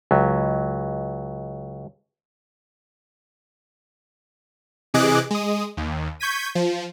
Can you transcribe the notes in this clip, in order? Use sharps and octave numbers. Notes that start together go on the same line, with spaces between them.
C#2 F#3
C3 E3 G#4 D#5 D6 F#6
G#3 D#6
D#2
C#6 G6 G#6 B6 D#7
F3